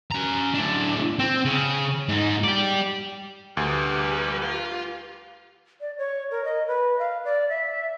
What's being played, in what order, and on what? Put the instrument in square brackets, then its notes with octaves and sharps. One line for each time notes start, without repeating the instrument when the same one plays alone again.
[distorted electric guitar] C#4 A#5
A2 D4
C4
C#3
G#2 D#4
G4 D5
[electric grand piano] D2 [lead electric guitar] G3 G#4 [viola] G4 B4
[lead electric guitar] F4
[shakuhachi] D5
C#5
A#4
D#5
B4
F5
D5
E5